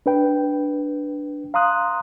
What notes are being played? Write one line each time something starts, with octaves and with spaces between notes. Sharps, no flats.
D4 B4 G5
F5 A#5 C6 D#6 F#6